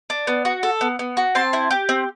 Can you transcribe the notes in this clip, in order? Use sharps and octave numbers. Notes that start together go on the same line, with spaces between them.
D4
B3
F#4
A4
B3
B3
F#4
C4 A5 C6
E4
G4
C4